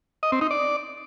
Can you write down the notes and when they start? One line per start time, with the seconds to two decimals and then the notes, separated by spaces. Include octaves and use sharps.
0.23 D#5
0.32 C4
0.41 D#4
0.51 D5